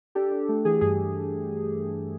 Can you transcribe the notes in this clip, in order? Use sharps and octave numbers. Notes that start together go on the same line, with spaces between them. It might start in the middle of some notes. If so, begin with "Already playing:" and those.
D4 G4 A4
D4
A3
E3 G#4
G2 G#4